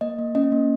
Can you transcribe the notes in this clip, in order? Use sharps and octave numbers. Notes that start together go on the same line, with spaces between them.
A#3 D#5
A#3
C#4 D#5
A#3